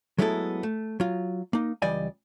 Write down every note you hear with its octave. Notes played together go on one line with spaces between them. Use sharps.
F#3 G#3 A3 B3 E4 A4
A3
F#3 F4
A#3 D#4
C#2 E3 G3 D5 D#5 G#5